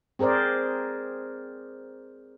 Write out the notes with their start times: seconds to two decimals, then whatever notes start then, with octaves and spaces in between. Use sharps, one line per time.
0.19 C4 G#4 A#4 C5 D5